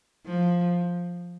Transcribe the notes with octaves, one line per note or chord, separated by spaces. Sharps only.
F3